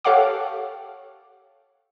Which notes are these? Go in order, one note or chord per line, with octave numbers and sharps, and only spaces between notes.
G4 A4 C#5 F5 F#5 D6